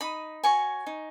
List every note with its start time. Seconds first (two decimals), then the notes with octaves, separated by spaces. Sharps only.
0.01 D#4 B5 D#6
0.44 F#4 C#5 G#5 C#6
0.87 D#4